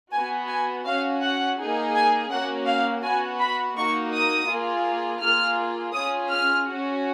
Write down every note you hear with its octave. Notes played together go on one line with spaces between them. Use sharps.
B3 F#4 G#5
G#5
C#4 F#4 F5
F#5
A#3 D#4 G#4
G#5
A#3 C#4 F#4 F#5
F5
B3 F#4 G#5
B5
A#3 D#4 F#4 C#6
D#6
A#3 F4 G#4
A#3 F4 G#4 F6
C#4 F4 G#4 D#6
F6
C#4 F#4